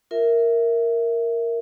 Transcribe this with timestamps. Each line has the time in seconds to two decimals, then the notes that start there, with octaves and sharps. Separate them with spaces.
0.11 F4 A#4 E5